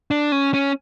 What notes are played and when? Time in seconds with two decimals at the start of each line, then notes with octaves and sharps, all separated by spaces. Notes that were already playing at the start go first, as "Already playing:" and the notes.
0.11 D4
0.32 C#4
0.54 C#4